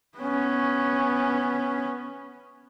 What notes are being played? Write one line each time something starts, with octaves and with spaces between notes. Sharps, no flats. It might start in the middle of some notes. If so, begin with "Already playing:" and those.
B3 C#4